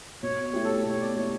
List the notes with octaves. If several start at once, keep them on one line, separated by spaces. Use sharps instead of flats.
B2 C#5
C#5
A3 E4 G4
A4
B2 C#5
D5
A3 E4 G4 C#5